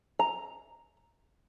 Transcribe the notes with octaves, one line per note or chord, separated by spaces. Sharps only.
A#5